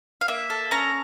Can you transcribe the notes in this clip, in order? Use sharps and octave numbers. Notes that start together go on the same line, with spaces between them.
F5
A#3 E5
A4
C#4 A#5